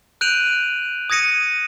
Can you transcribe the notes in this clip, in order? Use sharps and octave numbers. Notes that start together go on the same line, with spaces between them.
F#6 G6 D7 D#7 F7 F#7
D#6 G#6 A#6 C#7 D#7